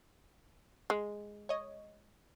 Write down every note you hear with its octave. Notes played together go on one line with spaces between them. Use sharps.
G#3
C#5 D#5